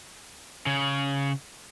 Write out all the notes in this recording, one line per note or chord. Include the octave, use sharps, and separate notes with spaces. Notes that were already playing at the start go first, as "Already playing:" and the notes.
C#3